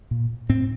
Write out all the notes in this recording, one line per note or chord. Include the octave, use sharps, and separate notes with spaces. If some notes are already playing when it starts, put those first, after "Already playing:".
A#2
A2 C4